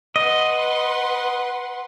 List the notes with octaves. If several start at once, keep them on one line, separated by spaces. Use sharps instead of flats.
B4 D#5 F#5 C6